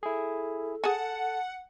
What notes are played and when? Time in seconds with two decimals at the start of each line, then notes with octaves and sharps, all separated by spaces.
0.03 E4 G#4 A4
0.84 G#4 F#5 G#5 A5